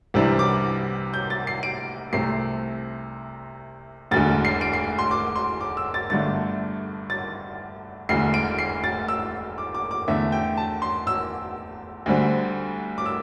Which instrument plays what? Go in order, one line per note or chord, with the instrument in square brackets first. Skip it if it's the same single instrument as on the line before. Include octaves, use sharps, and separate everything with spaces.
[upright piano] C2 C3 E3 G3 D4
D6
G6
A6
C7
D7
C2 C3 A3 C4 C7
E1 D2 D3 A6
C7
D7
C7
C6
D6
C6
D6
E6
A6
G1 G2 D3 A3 A6
A6
E1 D2 D3 C7
D7
C7
A6
E6
D6
D6
D6
E2 D3 A3 E5
G5
A5
C6
E6
D2 D3 G3 C4
D6
E6